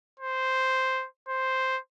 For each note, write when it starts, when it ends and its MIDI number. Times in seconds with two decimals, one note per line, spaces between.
0.20 1.06 72
1.29 1.78 72